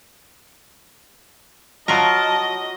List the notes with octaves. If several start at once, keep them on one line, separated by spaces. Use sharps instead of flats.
F#3 F4 A#4 D#5 A5